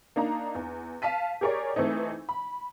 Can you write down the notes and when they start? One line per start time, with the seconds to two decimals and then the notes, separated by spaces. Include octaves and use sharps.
0.16 A#3 D4 D#4 A#5
0.55 E2
1.02 F5 A5 B6 D#7
1.41 G4 G#4 A#4 C#5 D5
1.76 E3 A3 C4 D#4
2.29 B5